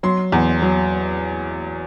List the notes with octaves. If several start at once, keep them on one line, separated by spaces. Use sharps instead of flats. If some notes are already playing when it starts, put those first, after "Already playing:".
F#3 C6
E2
F#3